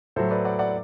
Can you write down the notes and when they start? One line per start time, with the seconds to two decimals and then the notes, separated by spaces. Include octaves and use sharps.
0.16 A2 F#3 A4 C5
0.31 B4 D5
0.45 D5 F#5
0.59 D5 F#5